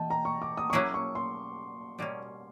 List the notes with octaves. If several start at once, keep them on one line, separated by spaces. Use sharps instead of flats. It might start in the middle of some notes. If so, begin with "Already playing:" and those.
Already playing: E3 D#5 G5 A5
A#5
C#6
D6
D#6
C#6
F#3 A#3 C#4 E4 G#4 D6
C#6
C6
B2 G3 A#3 C#4